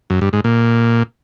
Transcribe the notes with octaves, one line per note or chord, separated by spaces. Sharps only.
F#2
G2
G#2
A#2